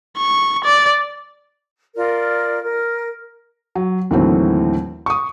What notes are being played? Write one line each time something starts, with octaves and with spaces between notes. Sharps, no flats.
C#6
D5
F4 A#4 D5
A#4
F#3
D#2 A2 D3 E3 F#3 C4
C#6 D#6